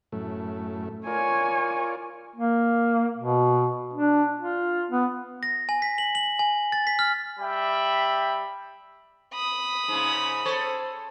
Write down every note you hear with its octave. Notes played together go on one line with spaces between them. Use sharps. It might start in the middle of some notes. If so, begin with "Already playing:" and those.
F#2 A2 A3
F4 A#4 C#5 D5 G#5
A#3
B2
D4
F4
B3
A#6
G#5
B6
F#7
F#7
G#5
A6
B6
F6
G3 E5 G5 B5
B5 D#6
G#2 C#3
A4 C5 C#5